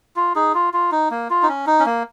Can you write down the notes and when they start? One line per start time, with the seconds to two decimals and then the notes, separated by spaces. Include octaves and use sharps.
0.16 F4
0.35 D#4 G#4
0.54 F4
0.74 F4
0.92 D#4
1.11 A#3
1.30 F4
1.43 D#4
1.49 C#4
1.67 D#4
1.80 C#4
1.86 A#3